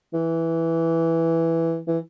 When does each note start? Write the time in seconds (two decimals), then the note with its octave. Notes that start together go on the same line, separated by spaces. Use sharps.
0.13 E3
1.87 E3